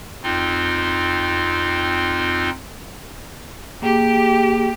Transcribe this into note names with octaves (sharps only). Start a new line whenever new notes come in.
F2 C4 D#4 F4
A#3 G4 G#4 G5